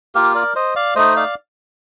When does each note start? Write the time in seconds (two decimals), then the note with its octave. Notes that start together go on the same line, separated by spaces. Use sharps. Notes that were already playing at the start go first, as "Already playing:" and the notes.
0.15 A#3 F4 G4 A#4
0.35 A#4 D5
0.55 C5 D#5
0.76 D5 F5
0.95 A3 D#4 C5 D#5
1.16 D5 F5